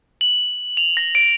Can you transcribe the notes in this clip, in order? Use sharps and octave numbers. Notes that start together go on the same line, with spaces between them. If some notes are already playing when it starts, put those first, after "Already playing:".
F#7
F7
A#6
D7